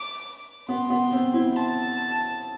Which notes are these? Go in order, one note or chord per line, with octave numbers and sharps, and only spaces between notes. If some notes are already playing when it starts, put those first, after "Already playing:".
Already playing: D6
B3 C6
B3
C4
C4 E4
A5